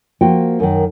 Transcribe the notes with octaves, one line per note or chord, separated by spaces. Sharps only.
F3 A#3 F#4 G5
F#2 D#3